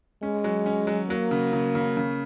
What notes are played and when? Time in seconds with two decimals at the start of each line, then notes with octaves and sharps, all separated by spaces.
0.22 G#3 C#4
0.44 F#3
0.66 C#4
0.87 F#3
1.09 F#3 A#3
1.31 C#3
1.53 C#3
1.75 C#3
1.97 C#3